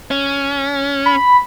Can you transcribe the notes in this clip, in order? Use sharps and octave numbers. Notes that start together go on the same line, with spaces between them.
C#4
B5